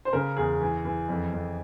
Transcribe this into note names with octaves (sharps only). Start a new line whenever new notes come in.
C5
C#3 A#4
E2 G#4
E3
E3
F2
F2